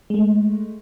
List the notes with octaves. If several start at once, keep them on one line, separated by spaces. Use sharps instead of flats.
G#3 A3